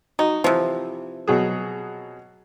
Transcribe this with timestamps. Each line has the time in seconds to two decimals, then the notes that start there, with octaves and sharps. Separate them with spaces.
0.19 D#4 F#4
0.44 C3 E3 F3
1.28 B2 F#3 G#4